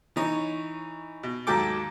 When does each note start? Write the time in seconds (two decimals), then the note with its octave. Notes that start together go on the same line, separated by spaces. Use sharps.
0.16 E3 D#4 C#5
1.23 B2
1.47 D#2 G#2 F#3 A4 G5 D6